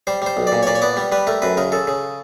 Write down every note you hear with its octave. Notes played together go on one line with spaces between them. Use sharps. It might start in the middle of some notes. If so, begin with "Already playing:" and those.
G3 C5
G3 C5
B1
D5
A#2
C#5
A#2 D5
C#5
B3 D5
G3
G3 B4
A3 A#4
F#2 B4
C#3 A#4
C#3 A4
C#3